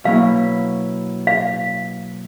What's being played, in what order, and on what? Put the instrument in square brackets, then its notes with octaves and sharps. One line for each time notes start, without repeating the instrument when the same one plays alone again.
[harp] B2 F#3 A#3 C#4 E4 [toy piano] F5
[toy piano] F5